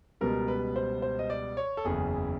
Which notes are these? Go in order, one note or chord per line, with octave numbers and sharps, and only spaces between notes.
C#2 B2 G3 B3 A#4
B4
C5
C5
D#5
D5
C#5
A4
F#1 E2 C#3 G#4